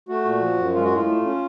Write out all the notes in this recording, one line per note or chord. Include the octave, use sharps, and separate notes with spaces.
A3 F#4
A#2
F3
F#2
G#3 F4
F#4
A2 F4
A3
C#4